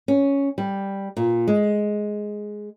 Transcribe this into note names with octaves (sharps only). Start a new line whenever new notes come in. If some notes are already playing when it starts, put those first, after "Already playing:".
C#4
G3
A#2
G#3